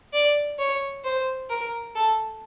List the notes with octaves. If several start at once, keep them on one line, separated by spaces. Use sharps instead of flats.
D5
C#5
C5
A#4
A4